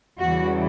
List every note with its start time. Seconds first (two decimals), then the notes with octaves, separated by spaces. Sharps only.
0.20 E2 C#3 E3 G3 F#4